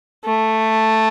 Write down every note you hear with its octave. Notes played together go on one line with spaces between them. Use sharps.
A3